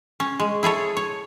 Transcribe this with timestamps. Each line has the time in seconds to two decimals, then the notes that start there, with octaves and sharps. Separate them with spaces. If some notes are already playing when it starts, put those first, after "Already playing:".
0.20 C#4
0.40 G#3
0.63 E4 G#4 A4 C#5
0.97 C#5